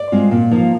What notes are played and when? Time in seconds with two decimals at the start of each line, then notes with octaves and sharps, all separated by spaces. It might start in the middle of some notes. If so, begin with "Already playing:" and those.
Already playing: D5
0.12 G#3 C4 F4
0.31 A#2
0.51 F3 A#3 D#4